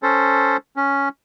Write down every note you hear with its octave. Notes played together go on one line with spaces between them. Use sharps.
C#4 A4 C5
C#4